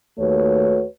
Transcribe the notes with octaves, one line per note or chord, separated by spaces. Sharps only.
D#2 A3 F#4 B4 C#5